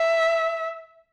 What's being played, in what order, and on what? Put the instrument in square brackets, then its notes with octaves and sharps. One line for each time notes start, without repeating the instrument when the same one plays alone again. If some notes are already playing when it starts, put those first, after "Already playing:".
Already playing: [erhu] E5